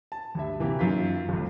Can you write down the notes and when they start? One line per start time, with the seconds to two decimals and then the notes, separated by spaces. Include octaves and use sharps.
0.12 A5
0.35 D2 G2 E5
0.60 C3 E3 A#3 G4
0.79 F#2 D#3 F4 B6
1.29 G1 C#2